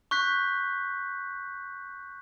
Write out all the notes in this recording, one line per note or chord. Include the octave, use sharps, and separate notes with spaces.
C#6 F#6 G6 B6